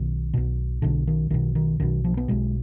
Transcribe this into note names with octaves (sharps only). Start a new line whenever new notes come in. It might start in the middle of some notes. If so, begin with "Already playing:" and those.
Already playing: B1 B2 D#3
B1 B2
B1 B2 D3
D#3
B1 B2 D#3
D#3
B1 B2 D#3
F3
B3
B1 B2 G#3